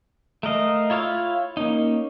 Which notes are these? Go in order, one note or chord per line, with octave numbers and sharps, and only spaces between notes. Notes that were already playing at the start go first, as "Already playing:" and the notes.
A3 A#4 D#5 F5
E4 F4 C#5 F5 E6
A#3 C#4 D#4